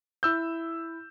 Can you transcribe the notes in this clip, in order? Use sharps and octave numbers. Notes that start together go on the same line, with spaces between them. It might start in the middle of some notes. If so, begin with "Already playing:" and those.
E4 E6 G6